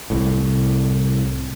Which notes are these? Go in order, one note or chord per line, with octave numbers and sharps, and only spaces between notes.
C2 A2